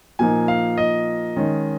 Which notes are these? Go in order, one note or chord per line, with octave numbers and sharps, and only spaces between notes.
A#2 F3 A#3 D#4 G#5
F5
D#5
D#3 G#3 C#4